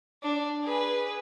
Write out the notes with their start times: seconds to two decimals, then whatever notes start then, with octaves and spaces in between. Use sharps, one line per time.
0.23 D4
0.64 G#4 B4